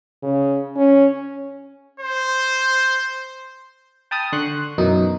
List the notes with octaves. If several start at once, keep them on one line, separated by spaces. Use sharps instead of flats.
C#3
C#4
C5
G5 A5 B5 D#6 F6
D3 C6 C#6 F#6
F#2 B2 D#3 E3 D#4